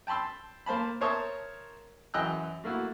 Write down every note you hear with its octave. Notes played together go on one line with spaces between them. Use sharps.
G5 A5 B5 C6 E6
A#3 C5 A5 B5
A#4 C5 C#5 E5 A5 D#6
F#2 E3 D#5 G5 E6 F#6
A3 A#3 E4 F#4